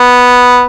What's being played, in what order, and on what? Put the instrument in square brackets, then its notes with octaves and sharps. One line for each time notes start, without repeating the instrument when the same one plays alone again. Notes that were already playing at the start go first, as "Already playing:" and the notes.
Already playing: [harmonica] B3